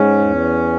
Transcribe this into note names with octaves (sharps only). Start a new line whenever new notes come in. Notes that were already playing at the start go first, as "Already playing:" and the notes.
Already playing: G#2 C#4
E2